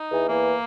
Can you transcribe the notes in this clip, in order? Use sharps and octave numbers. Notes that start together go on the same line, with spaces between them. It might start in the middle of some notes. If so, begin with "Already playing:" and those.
Already playing: D#4
E2 E3
E2 E3 A#3